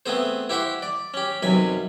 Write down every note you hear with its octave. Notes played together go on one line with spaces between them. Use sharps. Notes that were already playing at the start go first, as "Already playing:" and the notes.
A3 B3 C4 G#4 C5
E4 G4 C5 F#5 C6 C#6
D5
C#4 G4
B1 F#2 C3 G#5 B5